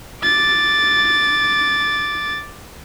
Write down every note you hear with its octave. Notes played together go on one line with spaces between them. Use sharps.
D6 A6